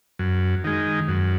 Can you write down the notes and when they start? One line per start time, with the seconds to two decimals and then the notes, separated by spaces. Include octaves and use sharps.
0.19 F#2
0.64 D#3 G#3
1.08 F#2